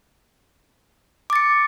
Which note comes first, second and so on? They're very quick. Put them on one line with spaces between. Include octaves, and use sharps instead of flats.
D6 A6 C#7